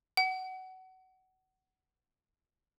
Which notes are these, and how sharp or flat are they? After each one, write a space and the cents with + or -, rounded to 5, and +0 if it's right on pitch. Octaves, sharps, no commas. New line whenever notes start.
F#5 +25